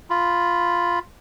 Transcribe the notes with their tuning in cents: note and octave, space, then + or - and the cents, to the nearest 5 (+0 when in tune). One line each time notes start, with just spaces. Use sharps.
F4 +0 B5 +0